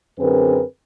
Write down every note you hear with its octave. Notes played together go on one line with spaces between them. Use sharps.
F#2 D3 C4 G#4 A#4 B4